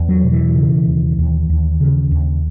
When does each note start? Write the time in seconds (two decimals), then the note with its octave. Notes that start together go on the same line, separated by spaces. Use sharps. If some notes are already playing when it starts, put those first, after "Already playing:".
Already playing: E2
0.09 F#3
0.24 B2
0.32 E3
0.56 C#3
0.87 D#2
1.19 D#2
1.50 D#2
1.80 C#3
2.12 D#2